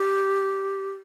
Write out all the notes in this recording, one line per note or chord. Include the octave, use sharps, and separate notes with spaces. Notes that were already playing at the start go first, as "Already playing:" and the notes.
Already playing: G4